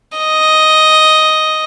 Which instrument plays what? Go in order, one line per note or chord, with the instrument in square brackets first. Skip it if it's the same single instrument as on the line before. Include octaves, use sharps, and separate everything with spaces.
[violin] D#5